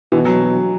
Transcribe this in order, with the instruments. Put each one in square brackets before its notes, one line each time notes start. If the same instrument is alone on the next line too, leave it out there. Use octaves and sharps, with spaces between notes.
[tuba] B2 [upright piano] E3
[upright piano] F#3